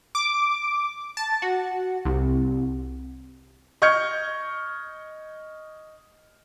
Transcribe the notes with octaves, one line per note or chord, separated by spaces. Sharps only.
D6
A5
F#4
C2
D#5 C#6 F6 G6 G#6 C#7